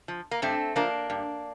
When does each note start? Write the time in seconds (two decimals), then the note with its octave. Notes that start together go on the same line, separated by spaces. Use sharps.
0.08 F3
0.31 A#3
0.42 G2 A3 C4
0.76 F3 A#3 D4
1.10 G2